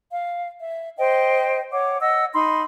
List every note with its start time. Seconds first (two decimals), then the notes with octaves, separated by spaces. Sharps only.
0.10 F5
0.59 E5
0.98 C5 D#5 G5
1.72 C#5 F#5 D6
2.00 D#5 F#5 E6
2.33 D#4 B5 C6